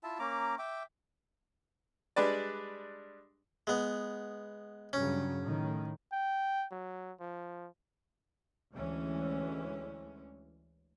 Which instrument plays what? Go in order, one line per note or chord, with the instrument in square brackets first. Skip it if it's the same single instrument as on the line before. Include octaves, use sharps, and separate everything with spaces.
[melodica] E4 F4 E5 A5
A#3 C#4 A#5 D6
E5 G5 D6
[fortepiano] G3 G#3 D4 B4 D5
[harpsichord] G#3 B3
[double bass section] G2 C#3 F#3 [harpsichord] C#4
[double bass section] A2 D#3
[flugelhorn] G5
F#3
F3
[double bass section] D2 E3 G#3 C#4